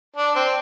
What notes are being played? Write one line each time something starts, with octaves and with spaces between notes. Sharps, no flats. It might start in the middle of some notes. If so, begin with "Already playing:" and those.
D4
C4